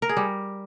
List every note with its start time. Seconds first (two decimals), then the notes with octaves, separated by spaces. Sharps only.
0.02 A#4
0.09 G#4
0.17 G3